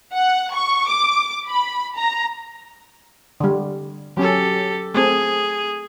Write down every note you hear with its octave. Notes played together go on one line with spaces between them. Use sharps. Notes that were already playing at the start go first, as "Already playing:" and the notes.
F#5
C#6
D6
B5
A#5
D3 G3
F#3 C#4 G4 A4
A3 C4 G#4 A4